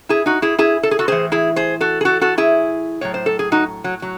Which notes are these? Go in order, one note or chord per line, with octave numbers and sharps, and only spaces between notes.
E4 G#4
D#4 F#4
E4 G#4
E4 G#4
A4
G#4
F#4 A4
A2 E3 G#4 C5
E4 G#4
G#4 C5
F#4 A4
G#4
F#4 A4
F#4 A4
E4 G#4
A2 F#3 C#5
C5
A4
G#4
D#4 F#4
F#3
F#3